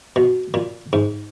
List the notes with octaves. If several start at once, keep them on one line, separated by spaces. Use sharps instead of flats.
B2
A#2
G#2